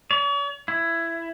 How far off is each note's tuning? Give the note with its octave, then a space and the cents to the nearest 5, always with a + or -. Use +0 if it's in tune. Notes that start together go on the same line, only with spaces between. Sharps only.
C#5 +45
E4 +15